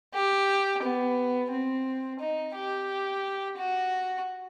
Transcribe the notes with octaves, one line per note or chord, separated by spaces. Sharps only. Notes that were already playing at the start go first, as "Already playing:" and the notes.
G4
B3
C4
D#4
G4
F#4